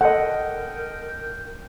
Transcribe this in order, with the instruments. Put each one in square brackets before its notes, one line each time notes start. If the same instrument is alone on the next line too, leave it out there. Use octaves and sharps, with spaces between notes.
[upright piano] A4 D#5 [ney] A#4 [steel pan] F#5 [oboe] G5